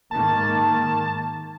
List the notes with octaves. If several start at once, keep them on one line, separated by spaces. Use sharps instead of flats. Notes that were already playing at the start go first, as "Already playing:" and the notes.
G#2 D#3 A#3 A5